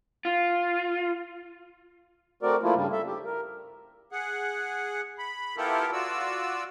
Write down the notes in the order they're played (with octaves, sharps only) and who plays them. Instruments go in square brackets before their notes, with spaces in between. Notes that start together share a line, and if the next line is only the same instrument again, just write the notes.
[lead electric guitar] F4
[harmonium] A3 C4 F#4 A#4 D5
F3 A3 A#3 E4 F4
G2 C#3 G3
A4 E5
G4
A#4
[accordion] G#4 F#5
B5
B3 E4 F4 G4 A4 A#4
F4 F#4 D5 E6